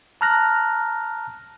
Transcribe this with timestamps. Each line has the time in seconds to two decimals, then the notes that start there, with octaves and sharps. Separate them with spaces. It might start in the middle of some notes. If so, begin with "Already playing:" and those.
0.21 A5 A#5 F6 F#6 A#6